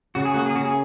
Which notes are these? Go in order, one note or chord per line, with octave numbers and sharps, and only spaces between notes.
C#3 F#4
G#4
A#3 F#4
G#4
C#3 F#4
G#4